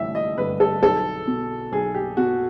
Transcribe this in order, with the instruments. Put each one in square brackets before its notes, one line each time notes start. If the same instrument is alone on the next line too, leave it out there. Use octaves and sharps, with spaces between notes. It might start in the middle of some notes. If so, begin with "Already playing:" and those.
Already playing: [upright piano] A1 G2 D3 E5
D#5
G2 D3 B4
A4
B1 A4
B2
B1 G#4
G4
B2 F#4